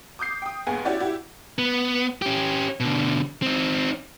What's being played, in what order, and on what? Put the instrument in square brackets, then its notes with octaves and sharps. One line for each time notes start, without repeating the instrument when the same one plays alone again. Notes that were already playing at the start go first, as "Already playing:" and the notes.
[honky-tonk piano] D6 D#6 G6 C7
G5 D#6
G1 D#2 B3 G#4 G#5
C#4 E4 F#4 G4 D5
E4 F#4 G4
[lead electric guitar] B3
C#4 G4
B2 D3
C4 D#4